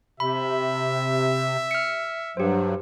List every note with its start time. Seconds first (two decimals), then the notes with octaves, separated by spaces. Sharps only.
0.20 C3 E5 B5
1.71 F6 C#7
2.37 G2 F#3 G4 C5